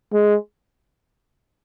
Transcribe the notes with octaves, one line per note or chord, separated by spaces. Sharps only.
G#3